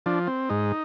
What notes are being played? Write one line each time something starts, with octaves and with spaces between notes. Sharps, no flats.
F3 D4
C4
G#2 D#4